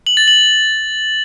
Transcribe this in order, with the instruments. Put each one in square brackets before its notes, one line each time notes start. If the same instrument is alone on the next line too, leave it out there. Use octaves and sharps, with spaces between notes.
[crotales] F#7
A6
F#7